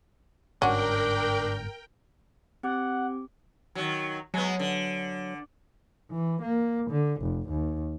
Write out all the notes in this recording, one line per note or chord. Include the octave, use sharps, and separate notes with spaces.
G1 G#2 C#4 D4 F#4 A#4 G5
C4 G4 F#5 D6
D#3 F#3
F#3 G#3 B3
D3
E3
A#3
D3
F1
D#2